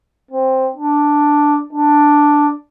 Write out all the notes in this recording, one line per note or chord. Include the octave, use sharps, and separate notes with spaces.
C4
D4
D4